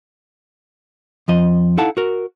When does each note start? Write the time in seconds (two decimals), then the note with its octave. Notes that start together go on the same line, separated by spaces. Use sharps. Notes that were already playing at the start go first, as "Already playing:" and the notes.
1.28 F2 F3 D#5
1.77 D#4 E4 A4 F5 F#5 A5
1.97 F#4 A#4